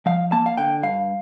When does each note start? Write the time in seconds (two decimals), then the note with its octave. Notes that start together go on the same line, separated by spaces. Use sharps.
0.06 F3 F5
0.32 A#3 A5
0.46 F5
0.57 D3 G5
0.83 G2 F5